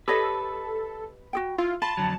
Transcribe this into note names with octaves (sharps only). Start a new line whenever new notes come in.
G4 A4 B4 C#5 D#5
F#4 G#4 G5
E4 F4
F4 A5 B5
F2 D3 F#3